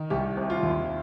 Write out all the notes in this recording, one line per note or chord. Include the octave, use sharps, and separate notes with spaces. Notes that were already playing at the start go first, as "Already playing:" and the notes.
Already playing: D#3
C2 G4
C3
F4
D#2